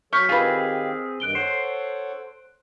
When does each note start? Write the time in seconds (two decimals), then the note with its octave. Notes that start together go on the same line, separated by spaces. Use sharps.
0.13 F#3 A4 C#5 C#6 F6 G6 B6
0.29 D#3 C4 F4 G4 G#4 B4 F5
1.20 G2 D#3 F#6 D7 G7
1.35 A4 C5 C#5 F#5